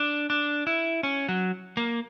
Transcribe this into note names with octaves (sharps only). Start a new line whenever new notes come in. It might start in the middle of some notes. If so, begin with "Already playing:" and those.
Already playing: D4
D4
E4
C#4
F#3
A#3